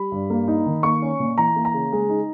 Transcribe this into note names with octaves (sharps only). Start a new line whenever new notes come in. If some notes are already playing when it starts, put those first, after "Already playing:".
Already playing: G3 B5
G2
A#3
D#4
D#3
A#3 C#6
C#4
A#2
E3 A#5
A#3
A#5
C#3
G#3
D#4